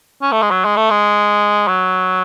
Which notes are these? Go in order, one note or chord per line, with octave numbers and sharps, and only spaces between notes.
C#4
A3
G#3
F#3
G#3
A3
G#3
F#3